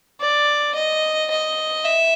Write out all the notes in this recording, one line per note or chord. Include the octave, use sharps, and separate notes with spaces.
D5
D#5
D#5
E5